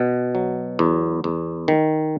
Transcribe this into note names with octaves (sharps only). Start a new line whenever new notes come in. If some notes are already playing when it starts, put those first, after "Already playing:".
Already playing: B2
F#3
E2
E2
D#3